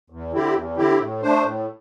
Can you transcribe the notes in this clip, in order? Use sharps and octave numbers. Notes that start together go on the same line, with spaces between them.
E2
D3 C4 E4 G4
E2
D3 C4 E4 G4
A2
A3 D4 C5
A2